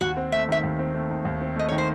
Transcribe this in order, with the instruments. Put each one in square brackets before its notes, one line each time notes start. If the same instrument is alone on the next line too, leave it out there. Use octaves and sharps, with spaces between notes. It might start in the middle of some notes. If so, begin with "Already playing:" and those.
[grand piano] D#2 [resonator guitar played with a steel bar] F#4
[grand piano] C4
[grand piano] A3 [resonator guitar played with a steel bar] E5
[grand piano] D#3 [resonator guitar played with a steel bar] E5
[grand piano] D#2
C4
A3
D#3
D#2
C4
[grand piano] A3 [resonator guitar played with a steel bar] D#5
[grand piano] D#3 [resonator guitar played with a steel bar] C#5
[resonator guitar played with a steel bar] C5